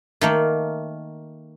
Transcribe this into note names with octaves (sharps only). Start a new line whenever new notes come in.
D#3 A3 A#3